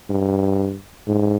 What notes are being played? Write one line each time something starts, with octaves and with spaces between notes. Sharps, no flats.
G2
G#2